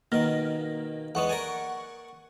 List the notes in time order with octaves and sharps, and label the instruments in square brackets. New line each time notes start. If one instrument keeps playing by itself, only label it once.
[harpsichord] B2 D#3 [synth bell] A#3
[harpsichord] E2 G#3 B3 [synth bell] F#5 C#6
[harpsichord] A#4 D5 G#5